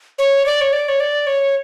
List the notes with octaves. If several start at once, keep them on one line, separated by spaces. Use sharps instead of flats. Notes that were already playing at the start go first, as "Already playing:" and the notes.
C#5
D5
C#5
D5
C#5
D5
C#5